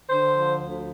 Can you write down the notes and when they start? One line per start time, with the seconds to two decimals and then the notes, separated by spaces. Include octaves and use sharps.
0.09 D3 C5
0.35 F3
0.60 D2